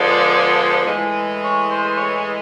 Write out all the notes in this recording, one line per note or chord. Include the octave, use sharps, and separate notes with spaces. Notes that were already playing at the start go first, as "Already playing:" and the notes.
Already playing: D3 F3 G#3 B3 D5
A2 E3 G#3
C#5
C5
C#5